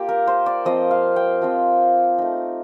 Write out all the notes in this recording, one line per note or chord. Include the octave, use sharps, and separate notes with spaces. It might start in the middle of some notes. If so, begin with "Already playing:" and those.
Already playing: A#3 F4 G4
A#4
C5
D5
F3 C4 F4 D#5
F5
G5
F3 C4 F4
A3 D#4